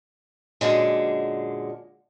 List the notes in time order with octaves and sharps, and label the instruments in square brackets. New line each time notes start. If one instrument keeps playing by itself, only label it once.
[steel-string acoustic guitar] F#2 A#2 D3 G#3